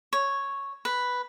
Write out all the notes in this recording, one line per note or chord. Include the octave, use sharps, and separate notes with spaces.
C#5
B4